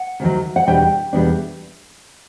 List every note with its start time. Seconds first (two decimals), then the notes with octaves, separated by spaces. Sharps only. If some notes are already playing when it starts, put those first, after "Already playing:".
Already playing: F#5
0.20 D2 C3 D#3 F#3
0.56 F#5
0.67 E2 B2 G3 B3 D4 G5
1.13 E2 B2 G3 B3 D4